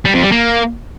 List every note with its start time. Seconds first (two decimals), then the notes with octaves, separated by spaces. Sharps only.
0.05 G3
0.14 F2
0.23 G3
0.32 A#3